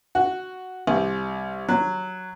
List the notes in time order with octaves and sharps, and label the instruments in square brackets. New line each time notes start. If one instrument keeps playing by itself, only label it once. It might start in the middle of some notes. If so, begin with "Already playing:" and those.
[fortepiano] F#4
C2
F#3